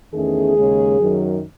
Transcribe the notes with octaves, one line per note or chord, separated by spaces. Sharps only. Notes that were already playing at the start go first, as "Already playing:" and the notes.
E2 D#3 A3 C#4 G#4
D#2 C#3 G#3
F#2 D#3 F#3